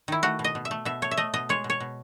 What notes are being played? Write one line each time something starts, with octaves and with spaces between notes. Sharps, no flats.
D#3 E4
A3 F#4
B2
D#5
B2
E5
A3
B2 E5
A3 C#5
E5
A3 D#5
B2 D#5
G#3 C#5
B2
C#5
B2